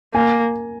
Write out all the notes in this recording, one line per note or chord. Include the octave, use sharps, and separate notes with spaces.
A#3 G#5